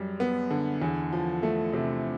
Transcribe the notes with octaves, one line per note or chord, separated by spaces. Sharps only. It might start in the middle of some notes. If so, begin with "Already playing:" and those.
Already playing: F#2 G3
B3
D3
E2
F3
A3
C3